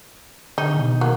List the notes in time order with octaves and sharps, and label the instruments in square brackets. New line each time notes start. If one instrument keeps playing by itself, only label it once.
[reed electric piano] D3 [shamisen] D#4
[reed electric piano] B2 D#3
[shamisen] F#3 A#3